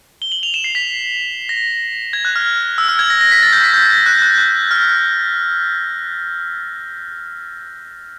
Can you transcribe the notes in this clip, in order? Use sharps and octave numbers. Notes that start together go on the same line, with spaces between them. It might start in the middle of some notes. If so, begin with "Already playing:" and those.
G7
F#7
F7
E7
C7
B6
A#6
G#6
F#6
F6
E6
F6
G#6
A#6
A#6
B6
A6
G6
B6
G6
F#6
F#6
F#6
F6